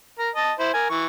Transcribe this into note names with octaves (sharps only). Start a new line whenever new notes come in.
A#4 A#5
D#5 A5
E4 C5
A#4 G#5
E3 C#6